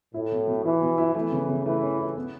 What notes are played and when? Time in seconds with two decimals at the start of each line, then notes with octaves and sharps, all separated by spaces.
0.14 A2 E4
0.32 B2
0.47 B2
0.64 E3 E4
0.82 B2
0.98 E4
1.15 E3 A3
1.32 C#3
1.49 C#3
1.66 E3 A3
1.82 C#4
1.99 E4
2.16 B3